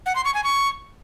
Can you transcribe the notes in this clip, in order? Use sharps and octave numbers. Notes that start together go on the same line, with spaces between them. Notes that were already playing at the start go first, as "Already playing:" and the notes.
F#5
C6
C#6
G#5
C#6